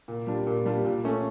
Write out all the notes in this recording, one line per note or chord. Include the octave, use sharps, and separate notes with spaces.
A#2
G3 D4 F4
A#2
G3 D4 F4
A#2
A3 C#4